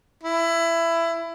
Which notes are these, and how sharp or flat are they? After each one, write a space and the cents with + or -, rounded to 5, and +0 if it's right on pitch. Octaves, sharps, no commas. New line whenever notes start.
E4 +20